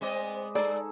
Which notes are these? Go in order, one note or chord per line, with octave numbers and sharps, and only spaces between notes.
G#3 B3 C4 C5 D5 D#5
G#3 D#4 G#4 A4 D5